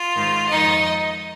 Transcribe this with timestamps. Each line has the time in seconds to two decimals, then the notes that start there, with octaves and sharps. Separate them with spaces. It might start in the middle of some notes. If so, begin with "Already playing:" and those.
Already playing: F4
0.16 G#2 D#3
0.51 F2 D#3 D#4 D#5